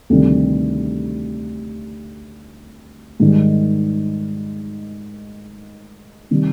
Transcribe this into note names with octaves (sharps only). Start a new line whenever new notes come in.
D2 C3 D#3 G3
G#2 D#3 G3
C3 D#3 G3